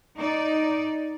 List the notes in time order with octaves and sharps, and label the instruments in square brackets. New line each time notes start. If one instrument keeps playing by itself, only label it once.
[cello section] D#4 D5